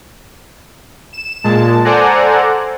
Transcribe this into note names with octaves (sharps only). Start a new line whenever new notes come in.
E7
A#2 G#3 A5
A4 C5 D5 F#5 G#5 A#5